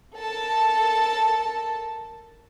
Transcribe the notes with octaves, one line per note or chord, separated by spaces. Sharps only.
A4 A#4 A5